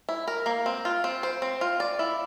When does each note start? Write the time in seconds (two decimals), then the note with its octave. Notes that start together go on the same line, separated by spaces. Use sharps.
0.09 E4
0.28 A#4
0.46 A#3
0.66 C4
0.85 F4
1.04 C4
1.23 C5
1.42 C4
1.61 F4
1.80 D5
1.99 E4